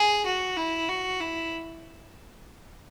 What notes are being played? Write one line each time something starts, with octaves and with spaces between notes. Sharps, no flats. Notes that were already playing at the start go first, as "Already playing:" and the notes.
Already playing: G#4
F#4
E4
F#4
E4